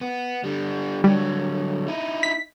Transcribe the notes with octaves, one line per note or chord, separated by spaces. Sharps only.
B3
D3 G3
D3 F#3 G3
D#4 E4
B6